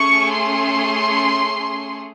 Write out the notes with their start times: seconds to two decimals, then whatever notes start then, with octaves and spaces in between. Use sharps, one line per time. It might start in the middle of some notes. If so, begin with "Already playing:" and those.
Already playing: A3 C#4 G#4 C#6
0.31 C6